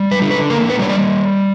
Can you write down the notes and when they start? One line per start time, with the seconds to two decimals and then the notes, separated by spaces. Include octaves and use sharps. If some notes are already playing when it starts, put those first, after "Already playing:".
Already playing: G3
0.11 B4
0.22 D3
0.31 B4
0.50 A#3 A#4
0.70 B4
0.79 G3 C#5
0.89 D5